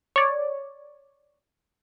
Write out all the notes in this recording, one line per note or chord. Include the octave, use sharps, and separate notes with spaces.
C#5 D5